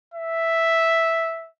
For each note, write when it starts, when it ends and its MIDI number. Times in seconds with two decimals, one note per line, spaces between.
0.14 1.48 76